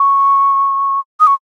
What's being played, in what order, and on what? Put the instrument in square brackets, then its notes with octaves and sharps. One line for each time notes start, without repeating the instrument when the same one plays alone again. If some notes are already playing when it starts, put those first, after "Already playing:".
Already playing: [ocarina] C#6
D#6
C#6